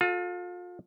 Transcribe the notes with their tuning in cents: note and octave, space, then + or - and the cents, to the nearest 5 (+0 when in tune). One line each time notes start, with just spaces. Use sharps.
F4 +35 A4 +0